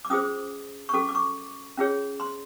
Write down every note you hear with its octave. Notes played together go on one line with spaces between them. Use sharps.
D6
C#4 F4 G#4 C5 D#6
C#6
C#4 F#4 A4 D6
D6
C#6
C#4 F4 G#4 C#5
C6